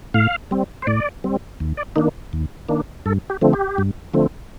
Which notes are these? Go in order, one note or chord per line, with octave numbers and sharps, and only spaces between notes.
A2 F5
G3 C4
C5
A2 D5
G3 C4
D#2
D5
D#3 A#3 D4 D#4
D#2
D#3 A#3 D4
G2 A4
G4
D3 F3 A3 C4
G4
G2
D3 F3 A3 C4